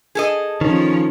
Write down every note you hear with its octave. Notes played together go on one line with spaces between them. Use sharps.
G#4 A4 D#5
D#3 F3 C#4